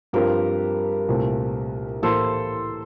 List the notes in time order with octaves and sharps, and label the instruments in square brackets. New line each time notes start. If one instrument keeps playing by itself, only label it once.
[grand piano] G2 F3 C4 F4 [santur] G4 A#4
[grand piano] C2 A#2 A3 C4
[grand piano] A2 E3 A#3 E4 [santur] A4 C5